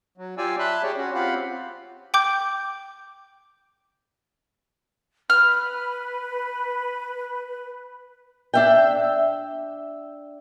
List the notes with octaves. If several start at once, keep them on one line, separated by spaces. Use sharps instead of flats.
F#3
F4 G4 D5 F5 G#5 E6
E5 A5 B5 C6 E6 F#6
G4 G#4 C#5 D5
C#4 F#4
C4 F4 G4 F5 F#5 B5
G5 D6 G6
B4 B5 F6
D4 E5 G5